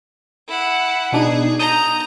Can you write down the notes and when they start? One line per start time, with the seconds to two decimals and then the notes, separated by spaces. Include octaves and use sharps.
0.48 E4 F#5
1.12 B2 D4 D#4 G#4
1.59 A#5 D#6 G6